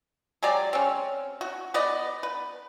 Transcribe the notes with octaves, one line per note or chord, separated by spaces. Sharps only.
F#3 G#3 G4 D5
C4 C#4
F#4
B3 B4 D5 D#5
B4